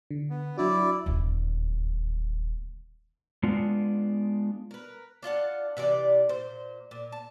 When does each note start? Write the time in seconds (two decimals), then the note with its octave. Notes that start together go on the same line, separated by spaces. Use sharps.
0.11 D3
0.30 B3
0.58 F#3 D4 E4 F#4 D5
1.06 D#1 D2
3.43 G#3 B3 D4 F4
4.71 A#4 B4
5.22 D4 F4 F#5 A5
5.77 C3 E3 E4 D5
6.29 A#2 C5
6.91 A#2
7.12 A5